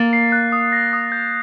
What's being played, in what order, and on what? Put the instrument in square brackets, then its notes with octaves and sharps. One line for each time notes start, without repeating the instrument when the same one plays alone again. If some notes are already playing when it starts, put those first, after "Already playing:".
Already playing: [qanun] A#3 [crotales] A6
[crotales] C7
F#6
D#6
A#6
D#6
G6